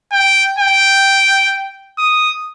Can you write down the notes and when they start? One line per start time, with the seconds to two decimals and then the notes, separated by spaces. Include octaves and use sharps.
0.12 G5
0.59 G5
1.98 D#6